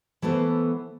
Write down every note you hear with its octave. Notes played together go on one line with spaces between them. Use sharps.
E3 A3 B3 A4 C5